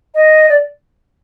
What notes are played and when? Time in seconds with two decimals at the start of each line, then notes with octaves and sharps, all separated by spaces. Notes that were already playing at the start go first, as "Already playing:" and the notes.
0.14 D#5
0.48 D5